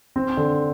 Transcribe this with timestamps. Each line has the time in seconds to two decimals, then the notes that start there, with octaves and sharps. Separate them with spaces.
0.16 C4
0.37 D3